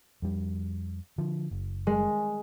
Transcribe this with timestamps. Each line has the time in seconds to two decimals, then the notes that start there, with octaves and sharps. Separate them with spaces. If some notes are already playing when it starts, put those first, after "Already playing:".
0.22 F2 G3
1.18 D3 F3
1.51 F#1
1.87 G#3